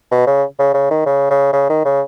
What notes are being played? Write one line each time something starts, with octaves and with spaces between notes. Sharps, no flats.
B2
C#3
C#3
C#3
D#3
C#3
C#3
C#3
D#3
C#3